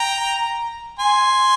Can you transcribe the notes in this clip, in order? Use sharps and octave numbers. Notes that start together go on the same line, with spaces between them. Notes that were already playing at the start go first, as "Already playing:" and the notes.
Already playing: G5 A#5
G#5 C6